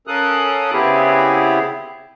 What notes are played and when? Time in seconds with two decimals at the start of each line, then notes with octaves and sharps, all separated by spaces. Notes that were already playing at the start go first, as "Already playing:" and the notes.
0.07 C#4 A4 A#4 F5 D#6 F#6
0.72 C#3 B3 C4 E4 G4 G#4